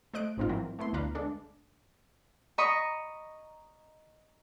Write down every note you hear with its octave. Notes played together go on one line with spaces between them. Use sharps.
A3 C5 D#5 F#6 D7
A1 G#2 C4 D#4 F4
E3 F#3 C4 A#4
A3 B3 E4 C6
D2 B2 D4 B4 F5 A#5
G#3 D4 A4
D#5 A#5 B5 C#6 D#6